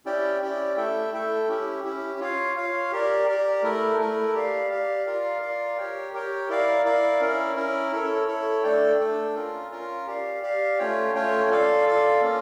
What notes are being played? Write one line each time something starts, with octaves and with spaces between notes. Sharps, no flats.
C#4 E4 G4 D5 G5
C#4 E4 G4 D5 G5
A3 E4 A4 E5 G5
A3 E4 A4 E5 G5
C#4 E4 G4
C#4 E4 G4
F4 C#5 F5
F4 C#5 F5
G4 A#4 D5
G4 A#4 D5
A3 E4 A#4
A3 E4 A#4
G4 D5 F5
G4 D5 F5
F4 A#4 D5 F5
F4 A#4 D5 F5
G4 A#4 C#5 G5
G4 A#4 C#5 G5
E4 A#4 D5 F5
E4 A#4 D5 F5
C#4 E4 A#4
C#4 E4 A#4
E4 A4 C#5
E4 A4 C#5
A3 D4 A4 D5 G5
A3 D4 A4 D5 G5
C#4 F4 A#4
C#4 F4 A#4
G4 D5 F5
G4 D5 F5
A3 C#4 F4 C#5 G5
A3 C#4 F4 C#5 G5
F4 A4 D5 F5
F4 A4 D5 F5
A#3 C#4 F4